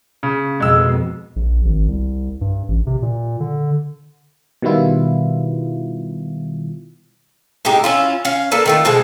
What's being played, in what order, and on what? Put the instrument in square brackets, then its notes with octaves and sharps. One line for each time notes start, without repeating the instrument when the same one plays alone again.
[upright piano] C#3
[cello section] F2 B2 [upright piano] G#3 E6
[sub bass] A#1
G#1
C2
G2
A1
C3
A#2
D3
[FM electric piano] B2 D#3 G3 B3 E4 F4
[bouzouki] A2 G#3 D#4 G4
C#4 E4 F4
C#4 F5
A#3 D4 A4 B4
D#3 A3 F4
B2 G#3 C4 A4